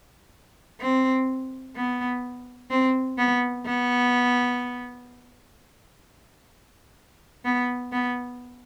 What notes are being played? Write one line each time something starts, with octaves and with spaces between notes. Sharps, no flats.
C4
B3
C4
B3
B3
B3
B3